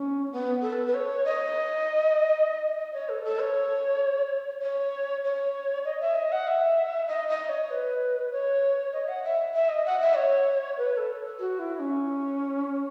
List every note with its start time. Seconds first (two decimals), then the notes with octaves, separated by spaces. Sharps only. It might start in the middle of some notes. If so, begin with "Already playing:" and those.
Already playing: C#4
0.32 B3
0.62 A4
0.73 B4
0.87 B4
0.94 C#5
1.25 D#5
2.78 D#5
2.93 C#5
3.09 A4
3.24 A4
3.40 C#5
4.62 C#5
5.24 C#5
5.85 D#5
6.00 E5
6.16 D#5
6.32 F#5
6.47 E5
7.08 D#5
7.28 D#5
7.49 C#5
7.71 B4
8.32 C#5
8.93 D#5
9.09 F#5
9.24 E5
9.54 E5
9.69 D#5
9.86 F#5
10.01 E5
10.16 C#5
10.78 B4
10.97 A4
11.39 F#4
11.59 E4
11.80 C#4